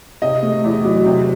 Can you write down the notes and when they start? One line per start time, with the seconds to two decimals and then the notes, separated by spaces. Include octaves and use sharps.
0.22 C3 D#5
0.43 A3
0.64 E2
0.84 F#3
1.06 C3